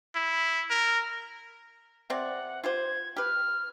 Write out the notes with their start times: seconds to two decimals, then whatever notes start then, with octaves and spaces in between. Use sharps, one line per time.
0.15 E4
0.70 A#4
2.10 C3 C4 D5 F#5
2.64 F4 G4 C5 G#6
3.16 G4 B4 F6